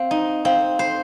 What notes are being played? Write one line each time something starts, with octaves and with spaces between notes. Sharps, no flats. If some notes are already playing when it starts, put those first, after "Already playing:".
Already playing: C4 F5
D#4
C4 F5
C5